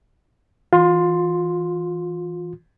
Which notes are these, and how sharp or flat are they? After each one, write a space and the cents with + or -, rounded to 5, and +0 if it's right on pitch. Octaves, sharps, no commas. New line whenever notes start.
E3 -5 F4 +30 C6 +0